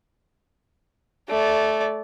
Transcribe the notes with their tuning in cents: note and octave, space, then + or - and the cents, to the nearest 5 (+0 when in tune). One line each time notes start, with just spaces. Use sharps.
A3 -10 D5 -15